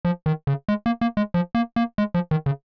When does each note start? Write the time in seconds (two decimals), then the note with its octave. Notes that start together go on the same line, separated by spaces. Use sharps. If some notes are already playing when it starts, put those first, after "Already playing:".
0.05 F3
0.26 D#3
0.47 C#3
0.68 G#3
0.86 A#3
1.01 A#3
1.17 G#3
1.34 F3
1.55 A#3
1.76 A#3
1.98 G#3
2.14 F3
2.31 D#3
2.46 C#3